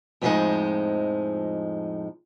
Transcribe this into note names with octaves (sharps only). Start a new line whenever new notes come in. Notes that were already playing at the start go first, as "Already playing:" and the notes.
F2 A2 F3 G3 G#3 D#4